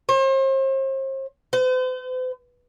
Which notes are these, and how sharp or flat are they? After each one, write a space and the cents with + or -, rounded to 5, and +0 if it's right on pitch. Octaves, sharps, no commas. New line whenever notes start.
C5 +40
C5 -45